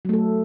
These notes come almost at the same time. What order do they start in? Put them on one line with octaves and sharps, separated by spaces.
F#3 A3 A4